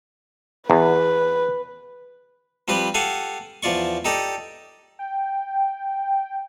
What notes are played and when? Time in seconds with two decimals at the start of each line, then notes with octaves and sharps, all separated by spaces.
0.70 E2 B4
2.68 F3 G3 C4 G4 B4
2.94 G4 A4 F5 F#5 G#5
3.63 E2 F3 F4 D5 C#6
4.05 D#4 G4 A4 D5 D#5
4.99 G5